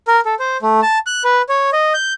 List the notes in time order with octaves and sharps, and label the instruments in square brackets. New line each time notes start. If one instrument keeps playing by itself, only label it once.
[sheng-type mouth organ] A#4
A4
C5
A3
A5
F#6
B4
C#5
D#5
G6